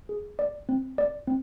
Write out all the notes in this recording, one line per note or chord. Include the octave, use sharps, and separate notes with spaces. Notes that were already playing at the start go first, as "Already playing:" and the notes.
G#4
D5
C4
D5
C4